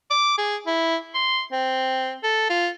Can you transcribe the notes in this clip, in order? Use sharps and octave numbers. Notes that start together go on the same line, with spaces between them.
D6
G#4
E4
C6
C4
A4
F4